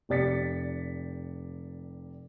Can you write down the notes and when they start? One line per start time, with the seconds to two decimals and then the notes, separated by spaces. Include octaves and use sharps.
0.09 F1 G4 D5 A6 B6 C#7